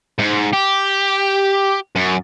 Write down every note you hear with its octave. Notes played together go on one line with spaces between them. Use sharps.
G#2
G4
F#2